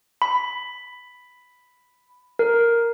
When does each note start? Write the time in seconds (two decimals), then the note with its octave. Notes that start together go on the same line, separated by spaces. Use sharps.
0.22 B5
2.39 A#4